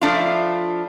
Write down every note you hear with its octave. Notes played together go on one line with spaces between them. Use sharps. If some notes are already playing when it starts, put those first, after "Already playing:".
F3 A3 D4 E4 F4